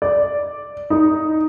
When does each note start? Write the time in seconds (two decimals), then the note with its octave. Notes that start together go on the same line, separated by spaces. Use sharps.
0.02 D5
0.90 D#4